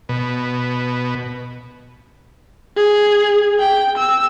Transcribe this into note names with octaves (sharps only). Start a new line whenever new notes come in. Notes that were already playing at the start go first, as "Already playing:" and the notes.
B2
G#4
G5
E6